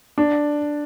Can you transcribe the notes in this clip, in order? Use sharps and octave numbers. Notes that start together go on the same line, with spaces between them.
D4